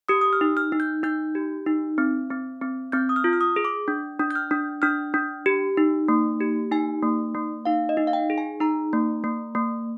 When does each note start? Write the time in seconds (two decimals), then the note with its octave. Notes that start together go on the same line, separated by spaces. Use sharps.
0.09 G4 D#6
0.21 D#6
0.33 F6
0.41 D#4
0.57 F6
0.72 D#4
0.80 G6
1.03 D#4 G6
1.35 G4
1.66 D#4
1.98 C4
2.30 C4
2.61 C4
2.92 C4 G6
3.09 D#6
3.16 F6
3.24 F4
3.33 F6
3.41 D#6
3.56 G#4
3.65 D6
3.88 D4
4.20 D4
4.31 G6
4.35 F6
4.51 D4
4.82 D4 F6
5.14 D4
5.46 G4
5.77 D#4
6.08 A#3
6.41 G4
6.71 D#4 G#5
7.03 A#3
7.35 A#3
7.65 D#4 F5
7.89 D#5
7.97 D#4
8.07 F5
8.13 G5
8.30 G#4
8.38 G#5
8.60 D#4 A#5
8.93 A#3
9.24 A#3
9.55 A#3